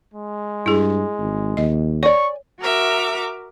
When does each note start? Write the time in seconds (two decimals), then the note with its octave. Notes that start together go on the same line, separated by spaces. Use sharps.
0.14 G#3
0.66 G2 E4 G#4
1.18 G#1
1.57 D#2 D#5
2.03 C#5 D5 G#5 C#6
2.60 F#4 A#4 E5 D6